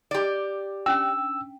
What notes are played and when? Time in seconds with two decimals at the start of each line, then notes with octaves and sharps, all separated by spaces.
0.11 G4 D5
0.86 C#4 D4 G5 E6